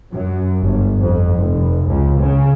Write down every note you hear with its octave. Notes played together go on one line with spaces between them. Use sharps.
F#2
G1
F2
F1
C#2
C#3